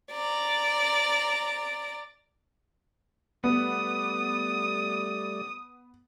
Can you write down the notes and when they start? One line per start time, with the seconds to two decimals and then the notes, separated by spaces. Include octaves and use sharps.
0.11 D5 A#5
3.44 G3 A3 B3 D5 D#6